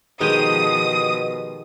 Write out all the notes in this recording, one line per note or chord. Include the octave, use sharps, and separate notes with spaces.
B2 D#3 F3 G#3 G4 D#6